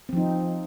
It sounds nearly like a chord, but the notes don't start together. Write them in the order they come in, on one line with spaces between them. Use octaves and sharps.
C4 F3 D#4